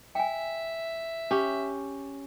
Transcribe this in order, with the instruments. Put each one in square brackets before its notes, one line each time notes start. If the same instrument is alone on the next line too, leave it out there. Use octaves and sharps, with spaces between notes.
[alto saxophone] E5 [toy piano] G5 G#5
[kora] C#4 G4